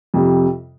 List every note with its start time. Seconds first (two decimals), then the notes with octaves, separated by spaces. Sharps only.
0.14 F2 C3 G3